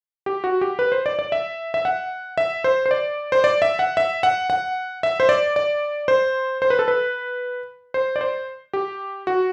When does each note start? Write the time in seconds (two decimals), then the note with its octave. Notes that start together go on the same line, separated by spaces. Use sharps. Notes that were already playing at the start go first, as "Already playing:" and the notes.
0.26 G4
0.44 F#4
0.61 G4
0.79 B4
0.92 C5
1.06 D5
1.19 D5
1.32 E5
1.74 E5
1.85 F#5
2.38 E5
2.64 C5
2.86 C5
2.91 D5
3.32 C5
3.44 D5
3.62 E5
3.79 F#5
3.97 E5
4.23 F#5
4.50 F#5
5.03 E5
5.20 C5
5.29 D5
5.56 D5
6.08 C5
6.62 C5
6.70 B4
6.79 A4
6.88 B4
7.94 C5
8.16 D5
8.21 C5
8.73 G4
9.27 F#4